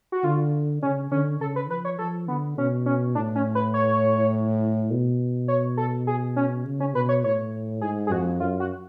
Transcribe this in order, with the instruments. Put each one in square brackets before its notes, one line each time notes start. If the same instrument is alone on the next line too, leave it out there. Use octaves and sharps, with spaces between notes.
[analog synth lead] F#4
[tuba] D3 [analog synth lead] F4
[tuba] C#3 [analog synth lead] C#4
[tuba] D3 [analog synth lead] C#4
[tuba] C#3 [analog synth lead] A4
[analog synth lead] B4
[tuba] F3 [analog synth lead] B4
[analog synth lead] C#5
[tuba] F3 [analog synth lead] A4
[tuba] D3 [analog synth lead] B3
[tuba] B2 [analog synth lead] C#4
[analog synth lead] C#4
[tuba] A2 [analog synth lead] D4
[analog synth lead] C#4
B4
C#5
[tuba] B2
[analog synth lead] C#5
A4
G#4
C#4
[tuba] C#3
[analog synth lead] C#4
[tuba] B2 [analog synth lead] B4
[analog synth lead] C#5
[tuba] A2 [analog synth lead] C#5
[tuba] G#2 [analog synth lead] G#4
[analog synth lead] G#4
[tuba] F2 [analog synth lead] F#4
[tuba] F#2 [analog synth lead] F4
[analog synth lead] F#4